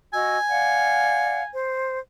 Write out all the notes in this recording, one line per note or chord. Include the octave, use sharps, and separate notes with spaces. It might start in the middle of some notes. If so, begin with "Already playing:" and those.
F#4 D#5 G#5 E6
D5 F5 F#5
C5